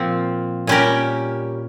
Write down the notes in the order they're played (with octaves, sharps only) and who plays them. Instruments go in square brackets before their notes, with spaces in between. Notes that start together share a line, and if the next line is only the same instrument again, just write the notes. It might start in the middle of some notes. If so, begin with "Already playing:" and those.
Already playing: [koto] A#2 F3 C4
A#2 G3 C#4 G4 A#4